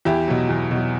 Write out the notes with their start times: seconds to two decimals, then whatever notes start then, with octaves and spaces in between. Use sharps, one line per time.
0.05 E2 E4 G4
0.27 B2 F#3
0.49 E2
0.71 B2 F#3